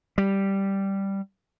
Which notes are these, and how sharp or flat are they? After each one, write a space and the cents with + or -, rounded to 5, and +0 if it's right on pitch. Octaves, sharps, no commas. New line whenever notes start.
G3 -5